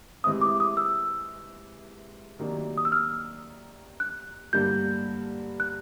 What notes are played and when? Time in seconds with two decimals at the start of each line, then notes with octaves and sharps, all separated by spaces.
0.24 C3 E3 G#3 C4 E4 D#6
0.41 D6
0.60 D#6
0.77 E6
2.39 C3 D#3 F#3 A#3 D4
2.78 D#6
2.85 E6
2.92 F6
4.00 F#6
4.53 G2 D3 G3 A#3 G6
5.60 F#6